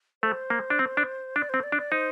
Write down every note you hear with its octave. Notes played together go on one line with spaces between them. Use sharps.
A3 C5
A#3
D4
C4
D4
D4 D5
C4 C5
D5
D4
D5
D#4 C5